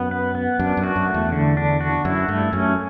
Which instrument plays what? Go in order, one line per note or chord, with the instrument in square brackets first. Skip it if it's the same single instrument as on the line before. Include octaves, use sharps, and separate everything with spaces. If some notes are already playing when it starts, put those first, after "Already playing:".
Already playing: [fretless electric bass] F#2 [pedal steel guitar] B3
[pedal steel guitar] B4
B3
[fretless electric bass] F#2 [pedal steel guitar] D4
[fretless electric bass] F#2
[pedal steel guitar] F#4
[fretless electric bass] F#2
[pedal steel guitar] A3
[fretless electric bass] E2
[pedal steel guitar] D3
D4
F#4
[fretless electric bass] F#2 [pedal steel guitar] E4
[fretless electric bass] G2 [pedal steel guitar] A3
[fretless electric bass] F#2 [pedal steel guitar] C#4